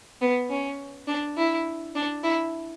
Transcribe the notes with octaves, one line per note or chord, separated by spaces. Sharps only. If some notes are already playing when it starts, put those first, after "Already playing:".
B3
C#4
D4
E4
D4
E4